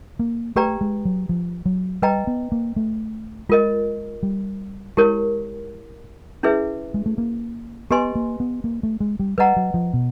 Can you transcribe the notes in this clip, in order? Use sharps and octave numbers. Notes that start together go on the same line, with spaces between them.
A#3
A3 G4 B4 D5 G5 A#5
G#3
F#3
F3
F#3
G3 B4 D#5 G5 A#5
B3
A#3
A3
G#3 F4 A#4 D#5
G3
G#3 E4 G4 A#4 C#5
C#4 E4 G#4 B4 E5
G#3
A3
A#3
B3 G4 B4 D#5 G#5 C6
A#3
B3
A#3
A3
G#3
G3
G3 B4 D#5 F#5 A#5
F#3
F3
B2